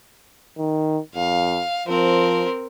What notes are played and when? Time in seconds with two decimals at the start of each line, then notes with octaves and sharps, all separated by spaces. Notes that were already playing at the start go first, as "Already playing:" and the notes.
0.58 D#3
1.15 F2 F5
1.88 F3 C4 A#4